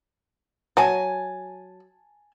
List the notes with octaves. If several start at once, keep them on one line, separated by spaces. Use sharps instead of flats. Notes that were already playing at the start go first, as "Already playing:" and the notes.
F#3 G#5 A5